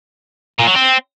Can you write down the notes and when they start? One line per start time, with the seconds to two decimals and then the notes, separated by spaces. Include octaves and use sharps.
0.59 A#2
0.67 F#3
0.75 C4